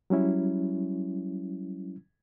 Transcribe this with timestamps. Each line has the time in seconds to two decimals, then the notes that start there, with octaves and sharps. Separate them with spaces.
0.10 F#3 G3 C#4 E4